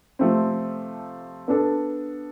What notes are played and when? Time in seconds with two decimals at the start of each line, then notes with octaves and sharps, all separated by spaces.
0.19 C3 F3 A3 C4
1.48 B3 D4 A4